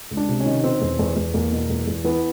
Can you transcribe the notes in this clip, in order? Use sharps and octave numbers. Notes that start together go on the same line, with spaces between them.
C#2
D4
C3
C#4
D#3
B2 C4
E2
E2
E2
E2 A#3
B2
E2
E2
E3 B3